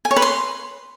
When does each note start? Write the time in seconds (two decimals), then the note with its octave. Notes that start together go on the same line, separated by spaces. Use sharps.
0.05 G#5
0.11 C#5
0.16 B4
0.22 C6